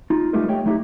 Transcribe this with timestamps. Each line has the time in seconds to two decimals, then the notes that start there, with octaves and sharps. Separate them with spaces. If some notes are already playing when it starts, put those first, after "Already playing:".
0.10 D#4 F4
0.33 F#3 G3 A3 D#4 F4 A#4
0.48 A3 G4 C#5 D#5 G5
0.65 F#3 A3 D#4 E4 G4